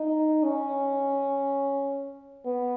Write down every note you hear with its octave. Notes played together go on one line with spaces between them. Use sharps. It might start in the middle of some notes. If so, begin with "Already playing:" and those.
Already playing: D#4
C#4
B3